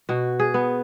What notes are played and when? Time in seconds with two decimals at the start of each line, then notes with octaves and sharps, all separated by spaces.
0.09 B2 F#4
0.40 G#4
0.54 B3